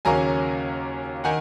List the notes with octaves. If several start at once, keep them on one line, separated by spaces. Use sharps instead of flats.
D#2 C#3 F#3 A#3 C#4 G#5 A#5
D#3 F#5 G#5